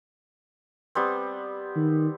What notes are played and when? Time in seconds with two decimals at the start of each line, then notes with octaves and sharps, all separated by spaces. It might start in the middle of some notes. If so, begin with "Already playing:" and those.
0.95 G3 B3 C4
1.76 D#3